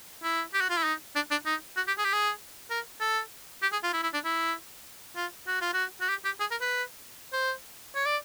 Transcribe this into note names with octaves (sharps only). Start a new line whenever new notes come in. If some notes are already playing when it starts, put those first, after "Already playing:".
E4
G4
F#4
F4
E4
D#4
D4
D4
D#4
F#4
G4
G#4
G4
G#4
A#4
A4
G4
G#4
F4
E4
E4
D4
E4
F4
F#4
F4
F#4
F#4
G4
G4
G#4
A#4
B4
C5
C#5
D5